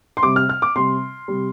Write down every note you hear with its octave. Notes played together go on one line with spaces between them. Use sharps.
C6
C3 G3 D6
F6
F6
D6
C3 G3 C6
C3 G3